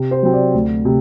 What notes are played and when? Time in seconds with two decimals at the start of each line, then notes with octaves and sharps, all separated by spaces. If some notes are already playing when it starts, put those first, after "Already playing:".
Already playing: C3
0.11 C5
0.23 F#3 C4
0.33 D5
0.54 D2
0.85 C3